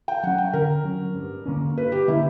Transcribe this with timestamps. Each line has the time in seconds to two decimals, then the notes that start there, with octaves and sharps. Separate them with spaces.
0.08 G5
0.23 F#3 C#4 F#5
0.38 G5
0.53 D3 A#4
0.84 F#3 C#4
1.15 G2
1.46 D3 A#3 C#4
1.77 G2 B4
1.92 G4
2.08 D3 A#3 C#4 E4